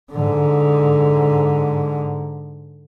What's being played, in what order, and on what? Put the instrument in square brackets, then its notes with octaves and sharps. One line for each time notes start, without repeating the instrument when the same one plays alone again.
[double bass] G#2 D3